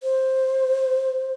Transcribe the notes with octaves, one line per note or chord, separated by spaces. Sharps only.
C5